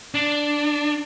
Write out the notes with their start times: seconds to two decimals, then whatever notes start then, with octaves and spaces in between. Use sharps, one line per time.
0.14 D4